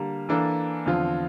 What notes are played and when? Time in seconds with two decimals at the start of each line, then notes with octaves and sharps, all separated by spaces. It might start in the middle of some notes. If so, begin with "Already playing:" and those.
Already playing: D3 G3 A#3
0.29 E3 A#3 D4 A4
0.86 E2 D3 F3 C4 F4